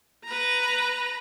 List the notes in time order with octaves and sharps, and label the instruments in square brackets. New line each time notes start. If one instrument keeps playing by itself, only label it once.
[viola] B4 A#5